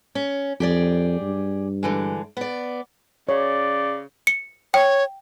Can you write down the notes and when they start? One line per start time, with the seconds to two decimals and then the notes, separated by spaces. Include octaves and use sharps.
0.15 C#4
0.60 F2 G4 G#4 D5
1.21 G2
1.83 D3 E3 G#3
2.37 B3 D5
3.29 C#3 C#5 D5
4.27 C#7
4.74 C#5 G5